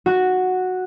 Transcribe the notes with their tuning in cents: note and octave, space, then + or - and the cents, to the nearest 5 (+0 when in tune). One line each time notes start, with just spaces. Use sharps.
F#4 -5